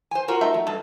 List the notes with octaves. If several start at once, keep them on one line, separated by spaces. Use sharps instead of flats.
C5 G#5
F4 F#4 A#4
A3 D#4 E5
F#3
G2 A4